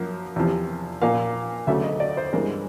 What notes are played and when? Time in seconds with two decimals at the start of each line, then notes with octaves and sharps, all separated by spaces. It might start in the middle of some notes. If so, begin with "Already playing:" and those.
Already playing: F#2 F3 A#3
0.36 E2 C3 F3
1.02 A#2 F3 A#3 F5
1.67 D2 C#3 F#3 A3 E5
1.84 D#5
2.00 D5
2.17 C5
2.33 G2 E3 G#3 C4 A#4